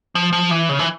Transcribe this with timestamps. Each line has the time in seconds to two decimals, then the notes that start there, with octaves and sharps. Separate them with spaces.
0.15 F3
0.33 F3
0.51 E3
0.69 C#3
0.79 E3